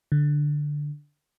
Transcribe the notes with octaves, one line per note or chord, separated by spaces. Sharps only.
D3